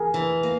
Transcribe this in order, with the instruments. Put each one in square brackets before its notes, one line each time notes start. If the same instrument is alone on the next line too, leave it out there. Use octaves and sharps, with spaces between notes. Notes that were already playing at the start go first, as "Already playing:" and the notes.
Already playing: [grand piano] G#4 A#4
[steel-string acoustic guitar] E3
A#3